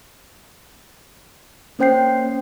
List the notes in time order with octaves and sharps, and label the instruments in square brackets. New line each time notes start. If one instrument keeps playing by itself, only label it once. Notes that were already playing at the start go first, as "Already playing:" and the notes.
[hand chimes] A#3 C#4 C5 G5 G6 C7